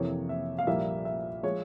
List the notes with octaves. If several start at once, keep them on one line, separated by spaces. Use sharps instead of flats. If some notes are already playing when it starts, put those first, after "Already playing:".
Already playing: F2 C3 E3 A#3 C#5
E5
F5
A#1 A#2 G3 A#3 E5
E5
F3 G#3 C#5